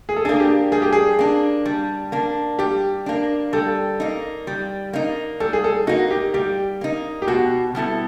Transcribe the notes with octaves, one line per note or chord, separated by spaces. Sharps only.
G#4
A4
A#3 D4 G#4
G4
G3 G#4
G4
G#4
A#3 D4
G3
A#3 D4
G3 G4
A#3 D4
G3 A4
A#3 D#4
G3
A#3 D#4
G3 A4
G#4
A4
A#3 D#4 F#4
G4
G3 G4
A#3 D#4
G4
B2 F#4
G3 B3 E4 A4